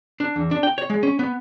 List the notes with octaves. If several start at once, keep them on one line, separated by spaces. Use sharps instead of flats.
D4
E2
D4
G5
C#5
G#3
C#4
B3